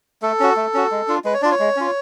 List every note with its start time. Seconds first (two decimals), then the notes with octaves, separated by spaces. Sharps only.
0.22 A3 A4
0.40 C#4 F#4
0.56 A3
0.74 C#4 F#4
0.91 G#3
1.08 D4 F4
1.24 G#3 B4
1.34 C#5
1.42 D4 D5
1.45 F4
1.51 C#5
1.59 G#3
1.76 C#4 F4